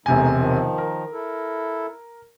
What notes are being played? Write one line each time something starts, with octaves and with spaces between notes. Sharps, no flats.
E1 C3 E3 A3 D#4 G#5
D#3 F3
A#4
E4 A4